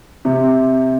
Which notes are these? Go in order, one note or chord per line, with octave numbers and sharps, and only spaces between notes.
C3